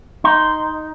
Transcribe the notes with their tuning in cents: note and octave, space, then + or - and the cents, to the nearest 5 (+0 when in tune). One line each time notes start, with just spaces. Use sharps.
D#4 +0 C6 +0